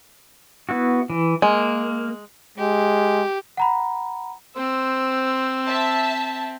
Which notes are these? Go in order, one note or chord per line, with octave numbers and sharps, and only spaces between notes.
B3 E4 F#4
E3
G#3 A#3
G#3 G4
F#5 A#5 B5
C4 C5 E6
E5 A5